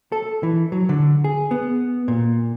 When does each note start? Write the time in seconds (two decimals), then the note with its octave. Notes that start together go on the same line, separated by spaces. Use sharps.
0.12 A4
0.43 E3
0.72 F#3
0.89 D3
1.24 G#4
1.51 B3
2.08 A#2